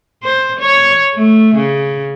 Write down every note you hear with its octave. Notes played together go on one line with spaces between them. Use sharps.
C5
C#5
A3
C#3